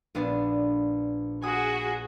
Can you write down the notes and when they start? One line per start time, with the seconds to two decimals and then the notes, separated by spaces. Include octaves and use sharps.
0.15 A#1 B3 D4
1.42 F#4 G#4 G#5 D#6